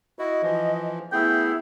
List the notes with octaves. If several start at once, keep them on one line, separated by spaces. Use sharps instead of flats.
E4 F#4 D#5
E3 F3
A3 B3 E4 G#4 G5